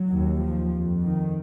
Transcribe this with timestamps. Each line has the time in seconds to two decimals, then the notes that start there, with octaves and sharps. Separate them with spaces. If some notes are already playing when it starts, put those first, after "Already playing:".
Already playing: F#3
0.11 D#2
0.42 F3
0.73 F2
1.03 D#3